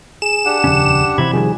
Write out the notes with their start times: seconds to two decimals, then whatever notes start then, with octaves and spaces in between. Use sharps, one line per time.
0.22 G#4 E7
0.45 D4 G4 F#5
0.64 D#1 F2 C#3 C#4
1.18 C3 E3 C4 B5 G#6
1.33 C3 D#3 F3 G3 G#4